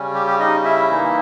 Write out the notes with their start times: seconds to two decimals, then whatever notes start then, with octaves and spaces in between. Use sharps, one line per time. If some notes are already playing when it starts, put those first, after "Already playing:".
Already playing: C#3 G3 C#4
0.15 G4
0.27 G4
0.40 D#4 D#5
0.65 E4 E5
0.90 E3 A#3 D#4